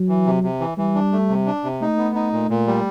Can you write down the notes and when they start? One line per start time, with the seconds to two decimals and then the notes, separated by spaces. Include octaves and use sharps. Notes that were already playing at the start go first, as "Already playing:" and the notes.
Already playing: F#3
0.09 E3
0.26 C3
0.43 C3
0.60 E3
0.78 E3 G3
0.95 D4
1.12 A3
1.29 C3
1.46 D4
1.64 C3
1.81 A3 D#4
1.98 B3
2.15 D#4
2.33 A#2
2.50 A#2
2.67 G3